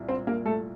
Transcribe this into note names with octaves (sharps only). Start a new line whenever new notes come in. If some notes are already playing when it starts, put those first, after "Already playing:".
Already playing: C2 A#2
C4 C5
A#3 A#4
A3 A4